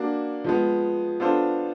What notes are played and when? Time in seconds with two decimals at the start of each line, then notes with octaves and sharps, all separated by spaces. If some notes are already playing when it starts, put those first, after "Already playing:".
Already playing: A#3 D4 F#4
0.44 F3 G#3 B3
1.20 B3 D4 F4 A4 C5